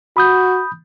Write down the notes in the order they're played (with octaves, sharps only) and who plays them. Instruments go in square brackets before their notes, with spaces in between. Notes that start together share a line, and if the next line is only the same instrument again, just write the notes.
[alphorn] F#4 [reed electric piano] B5 D#6 G6